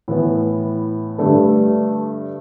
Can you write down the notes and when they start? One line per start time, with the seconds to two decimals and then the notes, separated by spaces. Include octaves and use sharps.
0.08 A2 E3 B3 E4
1.18 G2 D3 A3 D4 A4